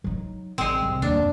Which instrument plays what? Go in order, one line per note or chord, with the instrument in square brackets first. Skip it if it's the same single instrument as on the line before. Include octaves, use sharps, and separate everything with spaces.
[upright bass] F#3 D#4
[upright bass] A1 [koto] G#3 C4
[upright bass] C2
[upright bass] D#2 G3 [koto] D4
[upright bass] F#2